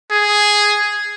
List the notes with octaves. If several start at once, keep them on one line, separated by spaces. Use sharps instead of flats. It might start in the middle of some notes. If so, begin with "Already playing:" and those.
G#4